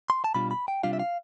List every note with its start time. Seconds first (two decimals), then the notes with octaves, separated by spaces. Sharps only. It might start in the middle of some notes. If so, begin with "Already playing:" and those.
0.10 C6
0.24 A5
0.35 B2 G3 D4 F4 B5
0.51 B5
0.68 G5
0.83 C3 G3 D4 F4 F5
0.93 E5
1.00 F5